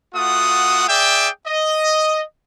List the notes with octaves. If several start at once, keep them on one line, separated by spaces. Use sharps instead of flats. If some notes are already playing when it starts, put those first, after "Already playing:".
A3 F4 F#4 F#5 D#6
G#4 D5 E5 G5
D#5